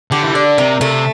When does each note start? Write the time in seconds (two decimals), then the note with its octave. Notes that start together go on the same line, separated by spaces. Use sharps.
0.12 D3 G4
0.24 E3
0.35 D3 D4
0.58 C3 A#4
0.81 C3 A3